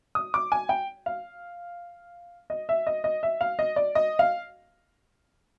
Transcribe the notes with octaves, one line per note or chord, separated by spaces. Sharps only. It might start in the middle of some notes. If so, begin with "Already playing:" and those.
D#6
D6
G#5
G5
F5
D#5
E5
D#5
D#5
E5
F5
D#5
D5
D#5
F5